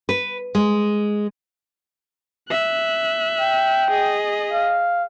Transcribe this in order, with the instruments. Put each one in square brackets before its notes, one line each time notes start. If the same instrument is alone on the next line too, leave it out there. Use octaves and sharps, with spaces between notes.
[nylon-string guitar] B4
G#3
[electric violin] E5 F#6
[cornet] G5
[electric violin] G#4 D#5
[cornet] F5